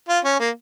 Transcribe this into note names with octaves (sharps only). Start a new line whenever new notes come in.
F4
C#4
A#3